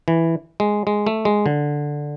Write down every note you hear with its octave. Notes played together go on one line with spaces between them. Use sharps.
E3
G#3
G#3
A3
G#3
D3